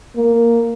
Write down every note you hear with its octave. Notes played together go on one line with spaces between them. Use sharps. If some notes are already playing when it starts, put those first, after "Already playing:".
A#3